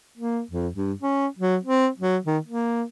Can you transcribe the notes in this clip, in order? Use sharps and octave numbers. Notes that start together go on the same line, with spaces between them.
A#3
F2
G2
C#4
F#3
C4
F#3
D#3
A#3